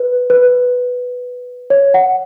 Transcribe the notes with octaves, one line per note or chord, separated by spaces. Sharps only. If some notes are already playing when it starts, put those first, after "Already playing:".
Already playing: B4
B4
C#5
F#5